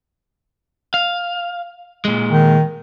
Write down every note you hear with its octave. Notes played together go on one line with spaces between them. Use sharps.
F5
A#2 G#3
D#3